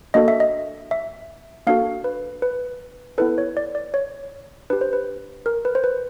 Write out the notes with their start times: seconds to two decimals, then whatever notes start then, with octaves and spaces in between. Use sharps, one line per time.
0.14 A#3 D4 F#4 A4 D#5
0.28 E5
0.40 D#5
0.91 E5
1.67 A#3 D4 F#4 A4 F5
2.04 B4
2.42 B4
3.18 B3 E4 A4 B4
3.38 C#5
3.57 D5
3.75 D5
3.94 C#5
4.70 D4 G4 B4
4.81 C5
4.93 B4
5.46 A#4
5.65 B4
5.75 C5
5.84 B4